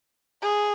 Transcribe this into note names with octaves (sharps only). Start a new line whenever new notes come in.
G#4